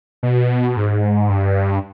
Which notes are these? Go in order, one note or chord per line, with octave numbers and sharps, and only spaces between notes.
B2
G#2
G2